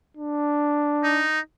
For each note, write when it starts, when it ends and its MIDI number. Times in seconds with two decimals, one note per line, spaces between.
0.17 1.25 62
1.03 1.40 63